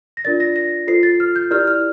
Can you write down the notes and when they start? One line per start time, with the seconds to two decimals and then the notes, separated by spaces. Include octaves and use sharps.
0.17 A#6
0.25 D4 F4 A#4 D5 A6
0.40 A#6
0.56 A#6
0.87 F4 A4 C5 C7
1.03 A6
1.20 F6
1.36 G6
1.50 E4 G4 A#4 D5 F6
1.67 F6